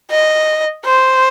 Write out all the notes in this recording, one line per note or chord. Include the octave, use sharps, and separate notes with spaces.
D#5
C5